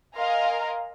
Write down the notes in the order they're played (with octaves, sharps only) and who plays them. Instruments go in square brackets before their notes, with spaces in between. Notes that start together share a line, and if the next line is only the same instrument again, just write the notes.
[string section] A#4 D#5 F5 G#5 A#5 C6